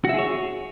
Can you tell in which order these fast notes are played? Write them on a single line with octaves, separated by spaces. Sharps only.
F#4 E5 G#4 C#5